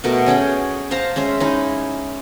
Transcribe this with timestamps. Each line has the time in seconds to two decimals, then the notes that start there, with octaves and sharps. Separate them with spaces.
0.04 B2 A3 A#4 F#5
0.26 C#4 G#4 F#5 G5
0.91 C5 F5 A5 A#5
1.16 G#3 C#4 E5
1.40 C#4 D#4 E4